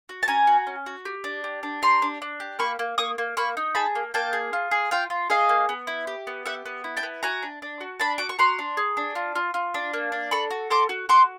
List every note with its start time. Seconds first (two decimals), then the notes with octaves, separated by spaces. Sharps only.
0.09 F#4
0.23 A5
0.28 C#4 G#5 A#5
0.47 F#4
0.67 C#4
0.86 F#4
1.05 G4
1.24 D4
1.44 G4
1.63 D4
1.82 G4 A#5 C6
2.02 D4
2.22 D4
2.40 G4
2.59 A#3 B5 C#6
2.79 A#3
2.98 A#3 C#6 D#6
3.18 A#3
3.37 A#3 B5 C#6
3.57 D#4
3.75 G#4 A5 B5
3.95 A#3
4.14 A#3 G5 A5
4.33 G#4
4.53 F4
4.71 G#4
4.91 F4 F5 G5
5.10 F4
5.30 G#4 D#5 F5
5.49 A#3
5.69 B3
5.87 E4
6.07 G4
6.27 B3
6.46 G4 E5 F#5
6.66 B3
6.84 E4
6.97 G5 A5
7.03 B3
7.23 F#4 G#5 A#5
7.42 D4
7.62 D4
7.81 F#4
8.00 D4 A5 B5
8.18 F#4 D6
8.29 C#6
8.39 F#4 A#5 C6
8.59 D4
8.77 G#4
8.97 D4
9.15 F4
9.35 F4
9.54 F4
9.74 D4
9.93 A#3
10.12 D4
10.31 A4 B5 C#6
10.51 F#4
10.70 A4 C6 D6
10.89 F#4
11.09 F#4 C6 D6